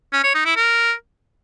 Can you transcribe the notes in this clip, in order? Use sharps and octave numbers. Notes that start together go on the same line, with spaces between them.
C#4
C#5
D#4
E4
A#4